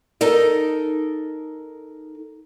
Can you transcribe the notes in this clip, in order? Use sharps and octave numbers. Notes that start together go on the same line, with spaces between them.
D#4 A4 A#4 D#5